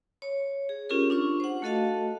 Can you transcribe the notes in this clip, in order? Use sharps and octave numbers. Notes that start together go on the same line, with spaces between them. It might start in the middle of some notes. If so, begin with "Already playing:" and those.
C#5
G#4
C#4 F4 G4 G#4 A#4
D4 F4 C#6
C5 F#5
A3 F#4 A4 D#5 F5 A5